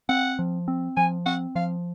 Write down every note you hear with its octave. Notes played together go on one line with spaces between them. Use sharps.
C4 F#5
F3
C4
F3 G#5
C4 F#5
F3 F5